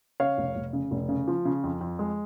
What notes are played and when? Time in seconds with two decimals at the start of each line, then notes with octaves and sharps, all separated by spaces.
0.20 C#3 C#5 F5
0.38 F1
0.56 F1
0.73 C#3
0.91 F1
1.09 C#3
1.28 F3
1.45 C#3
1.64 F2
1.81 F2
1.99 G#3